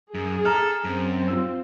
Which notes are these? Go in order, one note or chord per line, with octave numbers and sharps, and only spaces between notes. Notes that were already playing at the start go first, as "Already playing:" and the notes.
F#2 G#4
A4 A#5 F6
F#2 C4
F4 E6